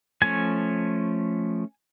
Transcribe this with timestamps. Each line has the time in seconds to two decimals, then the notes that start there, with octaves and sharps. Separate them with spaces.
0.22 F3 A3 C#4 G#5